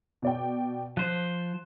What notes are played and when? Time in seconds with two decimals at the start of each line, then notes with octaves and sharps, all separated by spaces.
0.22 B2 D5 G5
0.97 F3 C5 F#6